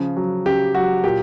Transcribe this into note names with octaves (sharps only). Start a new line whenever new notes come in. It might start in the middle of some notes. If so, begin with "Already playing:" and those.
Already playing: C#3 F3
F#3
C#3 G4
F#3 F#4
A#2 G4